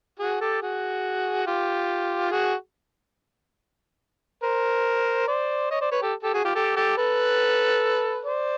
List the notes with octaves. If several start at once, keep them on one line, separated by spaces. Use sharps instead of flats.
F#4 G#4
G4 A4
F#4 G#4
F4 G4
F#4 G#4
A#4 C5
C5 D5
C#5 D#5
C5 D5
B4 C#5
G4 A4
G4 A4
F#4 G#4
F4 G4
G4 A4
G4 A4
A4 B4
C5 D5